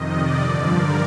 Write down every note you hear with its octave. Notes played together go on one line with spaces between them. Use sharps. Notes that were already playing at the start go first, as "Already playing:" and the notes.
Already playing: F2 C3 D#3 D#5
D5
G2 D3 F3
A#4